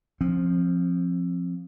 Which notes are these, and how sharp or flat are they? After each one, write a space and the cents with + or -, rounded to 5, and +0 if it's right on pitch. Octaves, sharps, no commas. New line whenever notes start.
F3 +0 C4 +25